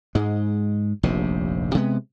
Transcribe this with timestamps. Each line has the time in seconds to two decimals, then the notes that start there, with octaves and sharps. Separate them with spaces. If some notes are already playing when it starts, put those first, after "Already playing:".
0.15 G#2 G#3
1.03 F1 A#1 D#2 C3
1.75 C3 G#3 B3